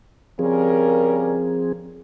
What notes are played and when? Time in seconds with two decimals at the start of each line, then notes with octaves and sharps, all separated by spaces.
0.39 C#3 F3 G3 C4 G#4 A#4